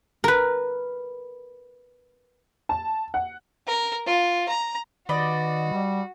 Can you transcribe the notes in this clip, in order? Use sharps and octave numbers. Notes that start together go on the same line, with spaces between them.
A#4 B4
A5
F#5
A#4
F4
A#5
D#3 F#4 B4 D5 D#5
G3